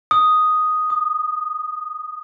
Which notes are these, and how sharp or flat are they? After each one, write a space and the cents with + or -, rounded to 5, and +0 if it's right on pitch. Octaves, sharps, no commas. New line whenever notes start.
D#6 +0
D#6 -30